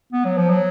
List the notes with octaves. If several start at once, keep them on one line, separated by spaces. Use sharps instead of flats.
B3
F#3
F3
F#3